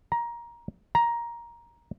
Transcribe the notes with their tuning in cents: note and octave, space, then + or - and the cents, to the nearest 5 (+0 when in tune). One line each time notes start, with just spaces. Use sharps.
A#5 +15
A#5 +10